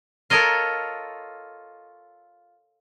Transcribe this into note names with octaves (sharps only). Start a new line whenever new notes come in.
F4 A4 A#4 C#5 D#5 F5